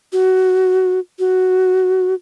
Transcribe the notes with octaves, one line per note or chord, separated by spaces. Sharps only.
F#4
F#4